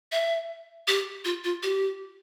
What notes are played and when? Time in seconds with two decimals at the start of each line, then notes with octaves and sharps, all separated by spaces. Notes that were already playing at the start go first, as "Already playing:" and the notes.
0.12 E5
0.88 G4
1.25 F4
1.44 F4
1.63 G4